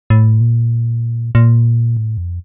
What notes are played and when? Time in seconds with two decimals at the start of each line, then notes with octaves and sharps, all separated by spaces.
0.10 A2
0.41 A#2
1.35 A#2
1.97 A2
2.18 F2